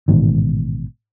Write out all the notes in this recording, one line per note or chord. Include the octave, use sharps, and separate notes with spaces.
A1 G#2 B2 D#3